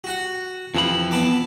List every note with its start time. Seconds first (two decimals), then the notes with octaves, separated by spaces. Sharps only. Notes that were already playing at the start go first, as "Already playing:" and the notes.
0.04 F#4 F#5
0.75 F2 E3 F3 B5
1.11 B3 A5 D6